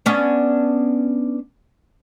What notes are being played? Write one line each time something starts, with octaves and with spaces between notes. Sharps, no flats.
B3 C#4 D4